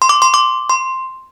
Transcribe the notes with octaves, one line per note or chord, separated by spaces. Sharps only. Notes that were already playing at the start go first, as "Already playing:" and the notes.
C6
D6
C6
D6
C6